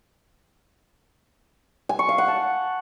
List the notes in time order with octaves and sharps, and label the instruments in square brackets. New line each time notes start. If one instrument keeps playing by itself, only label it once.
[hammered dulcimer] G#5
C#6
F5
F#5
A5